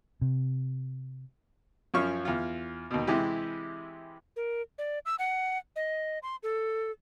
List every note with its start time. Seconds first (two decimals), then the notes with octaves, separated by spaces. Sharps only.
0.21 C3
1.94 F#2 F3 C#4 F4 F5 C#6
2.25 E2 F4
2.91 D#2 B2
3.07 C3 E3 G#3 E4 G4
4.36 A#4
4.78 D5
5.06 E6
5.19 F#5
5.76 D#5
6.23 C6
6.43 A4